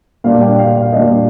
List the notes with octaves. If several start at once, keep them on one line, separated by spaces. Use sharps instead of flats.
A#2 G3 D4 F5
G5
F5
F5
A#2 G3 D4 D#5